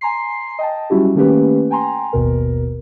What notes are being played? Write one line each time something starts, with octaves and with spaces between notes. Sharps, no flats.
G#5 A#5 C6 C7
D#5 G5 A5
F#3 G3 C#4 E4 F#4 G4
D#3 A3 A#3 C#4 G4 B4
G5 G#5 A#5 C6
G#1 D#2 B2 A#4